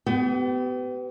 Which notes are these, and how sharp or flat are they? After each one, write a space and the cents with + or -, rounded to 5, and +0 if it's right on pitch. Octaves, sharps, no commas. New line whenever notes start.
B3 +30 G4 -30